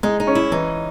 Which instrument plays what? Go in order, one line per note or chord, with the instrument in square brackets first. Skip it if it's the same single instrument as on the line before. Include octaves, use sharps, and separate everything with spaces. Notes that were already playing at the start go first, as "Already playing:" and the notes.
[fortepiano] G#3 [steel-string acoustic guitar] D#4
[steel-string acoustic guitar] D#4
[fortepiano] C#4
[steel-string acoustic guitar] E4
[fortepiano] E3 [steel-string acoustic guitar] D#4